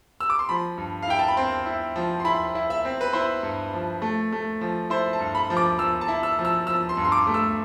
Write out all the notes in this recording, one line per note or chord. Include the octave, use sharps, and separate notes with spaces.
E6
D6
C6
F3 B5
G2
F5
E4 G5
A5
B5
C4 C6
E4
F3
C6
E4 B5
E4
E5
C4
B4
E4 C5
G2
F3
A3
A3
F3
E4 C5
A5
G2
B5
F3
D6
F3 E6
A5
E4
E6
F3
E6
F3 E6
C6
G2
C6
D6
A3
E6